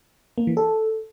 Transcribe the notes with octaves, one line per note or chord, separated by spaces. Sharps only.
A#3
E3
A4